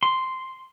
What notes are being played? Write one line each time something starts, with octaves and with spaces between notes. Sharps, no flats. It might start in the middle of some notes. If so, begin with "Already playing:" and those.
C6